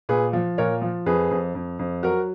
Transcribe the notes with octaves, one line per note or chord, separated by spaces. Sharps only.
A#2 G#4 B4
F3
A#2 A#4 C#5
F3
F2 G#4 B4
F2
F2
F2
F#3 F#4 A#4